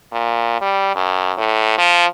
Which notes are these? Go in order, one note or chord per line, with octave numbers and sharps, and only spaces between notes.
A#2
G3
F#2
A2
F3